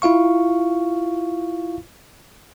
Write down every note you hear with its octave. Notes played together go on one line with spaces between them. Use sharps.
E4 F4 F5 C#6